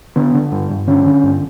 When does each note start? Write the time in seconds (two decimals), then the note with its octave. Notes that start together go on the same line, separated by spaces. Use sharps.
0.16 D3 B3
0.34 D3
0.52 G2
0.70 G2
0.87 D3 C#4
1.06 D3
1.23 G2